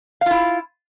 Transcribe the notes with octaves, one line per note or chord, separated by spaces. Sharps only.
E4 F4 F5